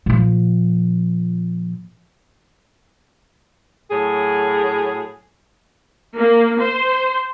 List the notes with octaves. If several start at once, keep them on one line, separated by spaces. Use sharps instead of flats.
A#2 F3
A2 F#3 G#4
A#3
C5